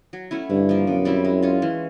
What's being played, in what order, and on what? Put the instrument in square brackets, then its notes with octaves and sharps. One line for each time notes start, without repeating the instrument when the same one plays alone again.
[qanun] F#3
A3 C#4 E4
[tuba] G2 [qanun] D3
[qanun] F3 A#3
[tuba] F#2 [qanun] B2
[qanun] G3 C4 E4
G#3
C#4 F4
E3